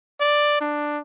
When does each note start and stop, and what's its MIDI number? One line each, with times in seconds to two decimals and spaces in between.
0.20 0.61 74
0.61 0.99 62